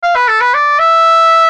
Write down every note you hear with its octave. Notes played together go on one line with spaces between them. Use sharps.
F5
B4
A4
B4
D5
E5